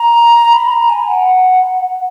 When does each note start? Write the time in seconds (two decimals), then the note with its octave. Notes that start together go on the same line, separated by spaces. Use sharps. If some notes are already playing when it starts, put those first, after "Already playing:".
Already playing: A#5
0.53 B5
0.71 A#5
0.90 G#5
1.08 F#5